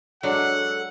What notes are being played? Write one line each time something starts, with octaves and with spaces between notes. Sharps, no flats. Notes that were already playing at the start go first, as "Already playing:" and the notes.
F#3 G#3 D4 A4 F#5